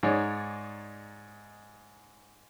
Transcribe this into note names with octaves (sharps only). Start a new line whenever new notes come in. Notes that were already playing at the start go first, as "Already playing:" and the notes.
G#2 D#4 G#4 C#5 D5